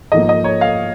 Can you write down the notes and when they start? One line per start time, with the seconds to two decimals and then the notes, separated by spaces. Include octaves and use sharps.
0.12 G#2 F3 A#3 D#5
0.29 D#5
0.44 C#5
0.61 F5